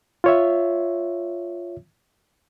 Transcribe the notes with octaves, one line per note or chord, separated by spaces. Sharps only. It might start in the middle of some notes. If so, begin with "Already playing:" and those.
F4 C#5 E5